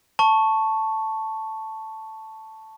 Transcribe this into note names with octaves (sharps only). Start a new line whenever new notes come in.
A5 C#6